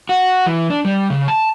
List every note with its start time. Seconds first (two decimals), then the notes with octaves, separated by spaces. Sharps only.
0.09 F#4
0.46 E3
0.70 D4
0.85 G3
1.10 C#3
1.28 A5